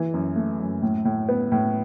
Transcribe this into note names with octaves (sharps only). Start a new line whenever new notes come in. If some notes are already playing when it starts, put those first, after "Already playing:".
Already playing: E3
F#2
A3
F#2
A2
A2
B3
A2